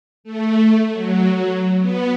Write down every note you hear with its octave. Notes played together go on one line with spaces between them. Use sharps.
A3
F#3
B3